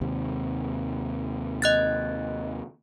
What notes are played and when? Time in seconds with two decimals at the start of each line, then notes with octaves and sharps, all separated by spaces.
0.01 D#2 C3
1.62 D#5 F#6 A6